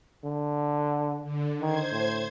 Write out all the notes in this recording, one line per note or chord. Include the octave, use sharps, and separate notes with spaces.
D3
D3
D#3 C5 G#6
A2